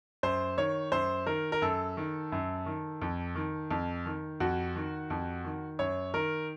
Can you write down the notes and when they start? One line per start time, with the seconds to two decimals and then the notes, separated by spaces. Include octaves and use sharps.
0.23 F#2 C5
0.57 D#3 C#5
0.92 F#2 C5
1.26 D#3 A#4
1.52 A#4
1.62 F#2 A4
1.97 D#3
2.32 F#2
2.66 D#3
3.02 F2
3.35 D#3
3.71 F2
4.06 D#3
4.40 F2 F#4
4.76 D#3
5.10 F2
5.45 D#3
5.79 F#2 C#5
6.14 D#3 A#4